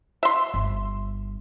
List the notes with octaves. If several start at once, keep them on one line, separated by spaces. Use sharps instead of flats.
E5 C6
G1